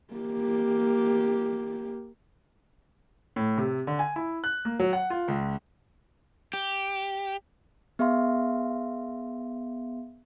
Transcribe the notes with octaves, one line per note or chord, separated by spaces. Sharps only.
A#3 G4
A2
C3
D3
G#5
E4
F#6
A#3
F#3
F#5
F4
C#2
G4
B3 G#4 E5 F5 C6